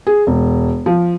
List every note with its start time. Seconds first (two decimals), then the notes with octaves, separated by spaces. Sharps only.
0.07 G#4
0.27 E1
0.86 F3